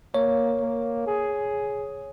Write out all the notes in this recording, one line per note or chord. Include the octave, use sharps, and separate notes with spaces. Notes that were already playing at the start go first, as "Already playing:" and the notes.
A#3 C#5
A#3
G#4